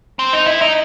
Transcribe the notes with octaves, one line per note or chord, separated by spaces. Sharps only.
C4
D#4
E4
D#4